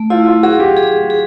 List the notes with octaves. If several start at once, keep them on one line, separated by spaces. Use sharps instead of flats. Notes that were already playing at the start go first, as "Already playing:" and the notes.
Already playing: A3
E4 F4
F4
F#4 G#4
G4
G#4
G#4